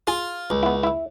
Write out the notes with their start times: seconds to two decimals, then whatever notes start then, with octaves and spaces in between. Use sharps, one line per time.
0.07 F4 G#4
0.50 C#2
0.63 B3 E4
0.83 E4 E5